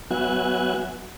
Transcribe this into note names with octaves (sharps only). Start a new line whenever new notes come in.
F#3 B3 F#4 E5 G#5 F#6